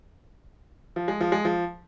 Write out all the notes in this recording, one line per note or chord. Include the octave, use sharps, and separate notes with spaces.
F3
G#3
F3
G#3
F3